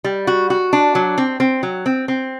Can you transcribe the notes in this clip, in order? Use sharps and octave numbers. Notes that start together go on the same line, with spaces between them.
G3
F#4
F#4
D4
F#3
C4
C4
F#3
C4
C4